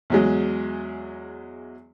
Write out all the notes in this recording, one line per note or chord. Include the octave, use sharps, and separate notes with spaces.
E2 F#3 G#3